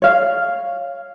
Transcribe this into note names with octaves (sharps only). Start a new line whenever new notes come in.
C#5 F5